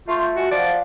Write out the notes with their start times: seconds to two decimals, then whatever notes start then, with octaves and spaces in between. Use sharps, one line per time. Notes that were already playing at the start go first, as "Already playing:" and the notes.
0.08 A3 F4 C6 C#6 G6
0.35 F#4 D#5 G#5
0.51 F3 D5 F5 F#5